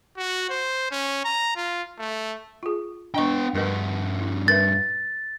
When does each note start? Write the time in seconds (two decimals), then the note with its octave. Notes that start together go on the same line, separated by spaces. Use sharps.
0.17 F#4
0.50 C5
0.91 C#4
1.25 A#5
1.56 F4
1.99 A3
2.63 F4 G#4
3.14 B3 D4 D#5 G5 C#6
3.55 G2 F#4 A#4 B4 D#5
4.21 E4
4.48 A#4 B4 E5 A6